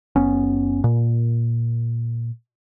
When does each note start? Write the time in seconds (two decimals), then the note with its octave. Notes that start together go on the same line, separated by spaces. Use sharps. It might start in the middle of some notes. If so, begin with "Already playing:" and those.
0.16 F#1 B3 C#4
0.84 A#2